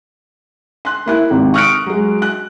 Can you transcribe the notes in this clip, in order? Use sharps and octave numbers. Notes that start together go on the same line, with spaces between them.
C6 F#6
A#3 E4 F#6
G#1 C3
C#6 D#6 F6 F#6 C#7 D7
F#3 G#3
F#6